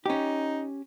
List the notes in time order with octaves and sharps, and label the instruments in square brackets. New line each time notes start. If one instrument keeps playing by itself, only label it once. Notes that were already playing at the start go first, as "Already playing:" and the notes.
[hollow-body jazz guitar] C#4 G4 [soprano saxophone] D#4